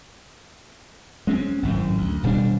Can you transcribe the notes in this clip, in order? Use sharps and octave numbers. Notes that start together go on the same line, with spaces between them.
G#3 C4 C#4
G#1 F#2 A2
D2
D#1 B2 G3 D4